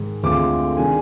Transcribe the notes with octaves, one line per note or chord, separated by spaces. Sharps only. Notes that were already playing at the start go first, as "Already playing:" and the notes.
Already playing: G#2 D#3
D2 D3 G#3 C4 F4 D6
C3 D#3 G#3 D4 G#5